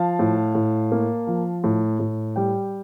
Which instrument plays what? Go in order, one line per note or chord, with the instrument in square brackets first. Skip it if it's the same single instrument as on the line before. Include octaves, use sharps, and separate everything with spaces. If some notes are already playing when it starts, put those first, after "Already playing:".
Already playing: [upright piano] F3 F5 A5
A2
A2
A#3
F3
A2
A2
G3 G5